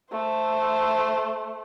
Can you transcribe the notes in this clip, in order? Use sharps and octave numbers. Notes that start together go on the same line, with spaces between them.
A3 C5